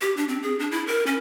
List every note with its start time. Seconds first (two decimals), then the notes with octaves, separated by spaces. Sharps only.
0.01 G4
0.17 D4
0.28 C4
0.43 G#4
0.59 D4
0.71 E4
0.87 A#4
1.07 C#4